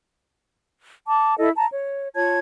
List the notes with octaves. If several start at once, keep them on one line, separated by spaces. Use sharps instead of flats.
A5 D6
E4 A4 D#5
A5 A#5
C#5
F4 C#5 A5 G#6